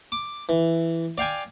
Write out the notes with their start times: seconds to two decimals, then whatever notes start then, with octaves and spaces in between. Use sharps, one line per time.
0.12 D6
0.49 E3
1.18 D5 F5 G5 G#5